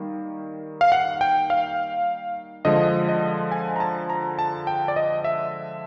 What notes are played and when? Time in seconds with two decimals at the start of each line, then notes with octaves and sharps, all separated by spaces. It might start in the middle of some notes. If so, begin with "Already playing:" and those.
Already playing: D#3 G3 A#3
0.81 F5
0.92 F#5
1.21 G5
1.50 F5
2.65 D3 F3 G#3 D#5
3.09 D#5
3.52 G#5
3.76 A#5
3.80 A5
4.10 A#5
4.39 A5
4.67 G5
4.88 D5
4.96 D#5
5.24 E5